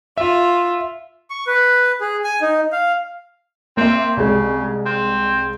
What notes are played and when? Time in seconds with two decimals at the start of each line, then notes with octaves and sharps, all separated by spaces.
0.18 F4 E5
1.30 C#6
1.47 B4
2.01 G#4
2.24 G#5
2.41 D#4
2.72 F5
3.77 A#3 C4 E5
4.17 C2 C#3 G#3
4.86 C4